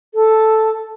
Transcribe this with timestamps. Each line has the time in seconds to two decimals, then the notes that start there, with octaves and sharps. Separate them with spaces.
0.14 A4